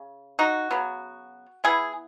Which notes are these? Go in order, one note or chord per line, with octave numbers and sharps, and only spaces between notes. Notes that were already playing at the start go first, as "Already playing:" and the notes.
Already playing: C#3
D#4 F#4
C#3 F#3 B3
E3 B3 E4 G#4